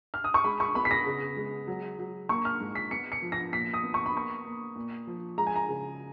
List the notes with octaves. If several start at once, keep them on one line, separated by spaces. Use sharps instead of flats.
F6
D#6
C#6
G#3 B5
C#6
B3 B5
B6
A#6
C#3
G#3
F#3
F#3
A#3 C#6
F6
G#2
B6
B3 C#7
C#7
F3
A#6
A#2 B6
D#6
B3
C#6
B5
A#3 C#6
A#3
A#2
F3
G#3 A#5
G#5
A#5
C#3